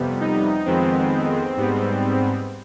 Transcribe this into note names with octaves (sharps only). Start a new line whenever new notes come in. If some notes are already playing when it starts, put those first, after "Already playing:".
Already playing: F2 C3 G3 B3
D#4
F2 D#3 G#3 B3 C4
G#2 G3 B3